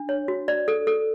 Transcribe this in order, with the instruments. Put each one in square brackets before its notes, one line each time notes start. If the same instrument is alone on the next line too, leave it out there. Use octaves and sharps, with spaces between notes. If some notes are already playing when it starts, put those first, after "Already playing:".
Already playing: [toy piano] D4
C#5
F#4
D5
A4
A4